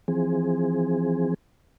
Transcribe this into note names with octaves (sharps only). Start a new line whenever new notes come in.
E3 F3 C4 G#4